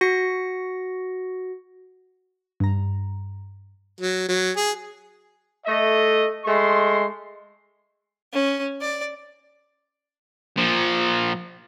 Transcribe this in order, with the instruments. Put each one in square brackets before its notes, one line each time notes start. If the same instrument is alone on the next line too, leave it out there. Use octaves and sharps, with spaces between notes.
[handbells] F#4 A#6 C#7
[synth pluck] G2 A#5
[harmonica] F#3
F#3
G#4
[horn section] A3 D#5
G#3 A3 C6
[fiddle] C#4
D5
[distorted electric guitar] A#2 F3